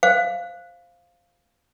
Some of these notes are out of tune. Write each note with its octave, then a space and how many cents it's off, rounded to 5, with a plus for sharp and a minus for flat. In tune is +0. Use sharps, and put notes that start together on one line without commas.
C5 +0 F5 +0